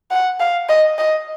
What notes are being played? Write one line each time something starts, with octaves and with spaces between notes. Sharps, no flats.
F#5
F5
D#5
D#5